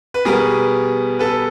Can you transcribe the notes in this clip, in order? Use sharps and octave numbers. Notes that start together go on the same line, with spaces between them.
B4
B2 G3 B3 G#4 A#4
A4 B4